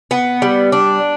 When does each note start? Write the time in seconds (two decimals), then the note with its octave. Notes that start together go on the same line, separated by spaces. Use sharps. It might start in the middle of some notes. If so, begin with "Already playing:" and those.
0.11 B3
0.42 G3
0.72 D4